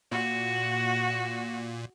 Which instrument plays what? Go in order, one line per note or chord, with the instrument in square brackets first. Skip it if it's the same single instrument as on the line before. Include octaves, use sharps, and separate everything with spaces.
[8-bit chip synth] A#2 [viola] F#4